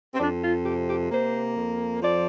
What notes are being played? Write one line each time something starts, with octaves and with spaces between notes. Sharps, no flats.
C4
F2 D4
F4
C3 G4
G4
A#3 C5
F2
F3 D5